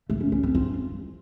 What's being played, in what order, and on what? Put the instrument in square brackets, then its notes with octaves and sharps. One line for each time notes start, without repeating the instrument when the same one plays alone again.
[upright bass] A3
C#4
C#4
C4
F4